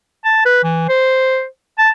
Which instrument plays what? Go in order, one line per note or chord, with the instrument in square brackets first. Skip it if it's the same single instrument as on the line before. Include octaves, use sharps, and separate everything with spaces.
[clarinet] A5
B4
E3
C5
A5